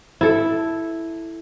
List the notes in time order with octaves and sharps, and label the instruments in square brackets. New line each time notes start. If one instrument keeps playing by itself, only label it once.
[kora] E4 A4